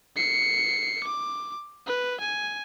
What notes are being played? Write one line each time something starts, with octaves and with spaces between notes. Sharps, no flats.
C7 C#7
D6
B4
G#5